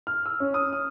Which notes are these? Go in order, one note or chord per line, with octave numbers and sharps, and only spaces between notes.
F6
E6
C#4
D#6
F6